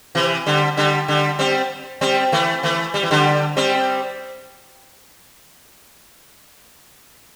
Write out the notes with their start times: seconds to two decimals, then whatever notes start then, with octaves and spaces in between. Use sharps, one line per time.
0.15 C3 E3
0.46 D3 G3
0.77 D3 G3
1.08 D3 G3
1.39 G3 C4
2.01 G3 C4
2.32 E3 A3
2.63 E3 A3
2.94 G3
3.03 E3
3.11 D3 G3
3.56 G3 C4